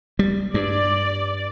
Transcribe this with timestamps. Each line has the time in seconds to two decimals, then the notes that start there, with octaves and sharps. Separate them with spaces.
0.19 G3
0.54 G2 D5